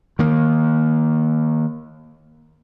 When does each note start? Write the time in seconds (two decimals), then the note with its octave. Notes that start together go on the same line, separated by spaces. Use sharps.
0.19 D#3 A#3